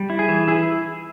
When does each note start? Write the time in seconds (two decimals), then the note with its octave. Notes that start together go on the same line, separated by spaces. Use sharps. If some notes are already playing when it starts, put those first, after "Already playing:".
Already playing: G3
0.10 E4
0.19 G#4
0.28 E3
0.48 E4 G#4